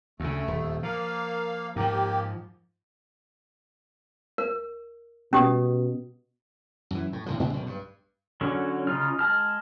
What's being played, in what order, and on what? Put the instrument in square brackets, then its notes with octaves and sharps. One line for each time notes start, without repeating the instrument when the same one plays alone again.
[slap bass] D2 C#3 [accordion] A3
[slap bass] D#1
[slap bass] F3 [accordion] A#3 F5
[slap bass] G#2 F3 [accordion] A#3 G4
[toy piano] A#4
[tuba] B2 [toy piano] C#4 G4 D#6
[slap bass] F#2 E3
A2
A2 D3 F3
A2 C#3 C4 D4
B1 B2 D#3
G2
[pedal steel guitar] D3 F#3 C#4
C#3 D#4 F4 F6
G#3 A5 F6